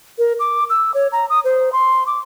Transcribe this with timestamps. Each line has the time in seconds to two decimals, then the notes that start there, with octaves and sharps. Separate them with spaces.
0.19 A#4
0.40 D6
0.70 E6
0.94 C#5
1.12 A#5
1.30 D#6
1.44 C5
1.73 C6
2.07 D6